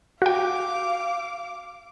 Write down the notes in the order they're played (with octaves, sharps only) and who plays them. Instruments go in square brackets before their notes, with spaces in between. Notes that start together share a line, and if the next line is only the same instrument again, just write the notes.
[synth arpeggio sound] F#4 G5 [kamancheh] F5 D6